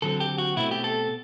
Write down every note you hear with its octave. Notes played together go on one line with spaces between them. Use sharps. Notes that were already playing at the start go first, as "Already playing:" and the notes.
D3 F#3 C4 A4
G4
F#4
B2 A3 C4 E4
G4
A4